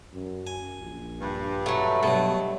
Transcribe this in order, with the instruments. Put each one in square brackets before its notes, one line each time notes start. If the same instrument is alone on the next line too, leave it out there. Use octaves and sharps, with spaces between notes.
[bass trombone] F#2
[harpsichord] G#5
[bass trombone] A#1
[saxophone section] G2
[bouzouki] F#3 A3
[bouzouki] B2 [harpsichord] F#3 A3 [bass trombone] G3